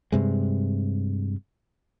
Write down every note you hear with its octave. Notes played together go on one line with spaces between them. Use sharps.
G2 C3 G#3